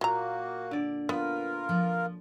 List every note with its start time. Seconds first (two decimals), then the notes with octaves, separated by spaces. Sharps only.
0.01 A#2 F#3 A#3 F#4 A#5
0.71 D3 D5
1.09 B3 F4 A#4 B4
1.69 F3